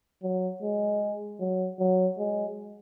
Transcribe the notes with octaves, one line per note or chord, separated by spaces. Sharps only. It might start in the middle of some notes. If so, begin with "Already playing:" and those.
F#3
G#3
F#3
F#3
G#3